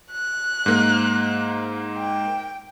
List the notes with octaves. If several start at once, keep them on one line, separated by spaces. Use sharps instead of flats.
F#6
G#2 A#3
G5